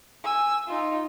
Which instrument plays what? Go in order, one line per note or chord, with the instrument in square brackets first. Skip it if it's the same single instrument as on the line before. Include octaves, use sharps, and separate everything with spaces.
[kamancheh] G#5 E6
D#4 F4